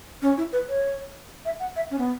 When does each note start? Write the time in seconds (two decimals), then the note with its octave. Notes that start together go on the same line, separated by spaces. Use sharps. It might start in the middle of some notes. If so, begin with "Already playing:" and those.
0.22 C#4
0.38 E4
0.53 B4
0.69 C#5
1.45 E5
1.60 F#5
1.76 E5
1.91 C#4
1.99 B3